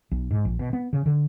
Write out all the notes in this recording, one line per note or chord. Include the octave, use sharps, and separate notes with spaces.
B1
G#2
A#1
B2
B3
C#3
D3